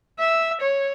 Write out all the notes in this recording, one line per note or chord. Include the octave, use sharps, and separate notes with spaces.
E5
C#5